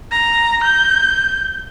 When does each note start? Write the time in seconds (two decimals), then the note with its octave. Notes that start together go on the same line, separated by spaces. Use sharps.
0.11 A#5
0.63 G6